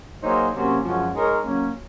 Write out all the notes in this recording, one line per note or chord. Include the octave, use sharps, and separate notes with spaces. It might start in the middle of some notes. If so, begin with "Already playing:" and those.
F#3 A#3 D#4 G#4 C5
C3 F#3 A#3 C#4
F#2 F3 G#3 C#4 F#4
G#3 D#4 A#4 C#5
F#3 A#3 C#4